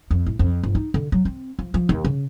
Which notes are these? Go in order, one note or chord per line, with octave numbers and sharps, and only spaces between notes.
F2
A2
F2
G1
D#4
D3
F#3
C4
F3
F3
D#2
C#3